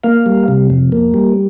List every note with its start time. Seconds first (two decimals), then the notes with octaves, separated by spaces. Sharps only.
0.04 A#3 F5
0.26 G3
0.48 C3
0.70 F2
0.92 A#3
1.14 G3